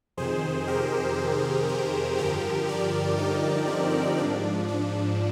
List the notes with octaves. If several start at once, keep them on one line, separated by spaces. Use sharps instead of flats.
F2 C3 D#3 G#4 C5
G4 A#4
G#4 C5
G2 D3 F3 G4 A#4
A#4 D5
D#4 G4
C4 D#4
G#2 F3 D4
D4